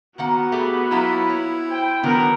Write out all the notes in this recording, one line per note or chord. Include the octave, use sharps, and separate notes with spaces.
D#3 A#3 B3 F#4 F#5
A3 G4 G#4 B5
F#3 A#3 E4 F4
C#5
C5 G5
D3 D#3 F#3 B3 A#4